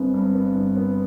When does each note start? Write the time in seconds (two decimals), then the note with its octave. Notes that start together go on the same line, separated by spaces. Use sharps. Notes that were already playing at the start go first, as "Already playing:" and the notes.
Already playing: G1 B3 C4
0.14 G2
0.35 B3
0.55 G1
0.77 B3